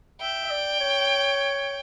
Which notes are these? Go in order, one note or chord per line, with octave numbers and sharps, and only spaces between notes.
E5 G5
E5
D5
C#5